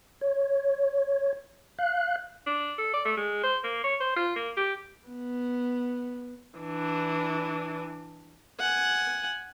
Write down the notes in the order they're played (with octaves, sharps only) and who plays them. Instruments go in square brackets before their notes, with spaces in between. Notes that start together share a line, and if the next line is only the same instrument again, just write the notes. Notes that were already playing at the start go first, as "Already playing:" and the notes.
[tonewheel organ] C#5
F5 F#6
[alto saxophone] D4
A4
D5
A3
G#3
C5
A#3
C#5
C5
F4
A#3
G4
[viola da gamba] B3
[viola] E3 D4
[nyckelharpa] F#5 G#5